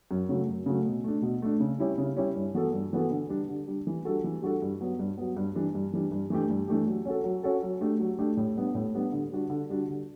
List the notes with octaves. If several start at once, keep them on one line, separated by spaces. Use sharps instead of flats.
F#2
C#3 F#3 A3
F#2
C#3 F#3 A3
B2
A3 D4
B2
A3 D4
C#3
G3 C#4 E4 G4
C#3
G3 C#4 E4 G4
G2
E3 B3 F#4 A4
G2
E3 B3 F#4 A4
D3
G3 D4
D3
G3 D4
E3
G3 D4 F#4 A4
E3
G3 D4 F#4 A4
G2
F#3 B3
G2
F#3 B3
G2
E3 G3 D4
G2
E3 G3 D4
G2
E3 A3 D4 G4
G2
E3 A3 D4 G4
F#3
C#4 F#4 A4
F#3
C#4 F#4 A4
F#3
A3 D4 G4
F#3
A3 D4 G4
A2
G3 B3 D4
A2
G3 B3 D4
D3
G3 D4 F#4
D3
G3 D4 F#4
D3